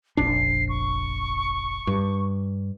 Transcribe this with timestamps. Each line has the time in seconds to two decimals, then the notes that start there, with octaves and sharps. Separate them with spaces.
0.17 F1 A#1 D4 C7
0.69 C#6
1.87 G2